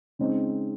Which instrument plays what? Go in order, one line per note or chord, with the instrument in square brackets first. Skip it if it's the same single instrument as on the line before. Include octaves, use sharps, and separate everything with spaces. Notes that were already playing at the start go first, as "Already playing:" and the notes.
[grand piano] C#3 G#3 C4 D#4